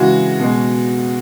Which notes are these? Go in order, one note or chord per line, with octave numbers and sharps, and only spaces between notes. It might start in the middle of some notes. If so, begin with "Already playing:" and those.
Already playing: C#3 E3 G#3 F#4
B2 G#3